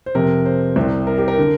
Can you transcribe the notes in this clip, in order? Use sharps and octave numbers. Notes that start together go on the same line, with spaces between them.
C5
F2 C3 A#4
C5
C2 C3
A#4
G4
A#4
D3